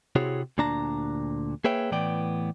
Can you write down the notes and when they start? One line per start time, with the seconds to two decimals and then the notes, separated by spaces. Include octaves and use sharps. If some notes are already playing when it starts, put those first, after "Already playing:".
0.16 C3 C4 E4 F#4 G#4 C#5
0.58 D2 A#2 D4 A5 A#5
1.64 A#3 G#4 B4 C#5 E5 G5
1.92 A2 E3 B3 D5 G5